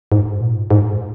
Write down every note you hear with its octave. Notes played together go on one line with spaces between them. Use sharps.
G#2
A#2
G#2